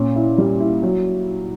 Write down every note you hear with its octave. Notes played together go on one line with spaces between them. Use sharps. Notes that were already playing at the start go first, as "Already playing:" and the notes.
Already playing: A#2 C#4
E4
G3
E4
F#3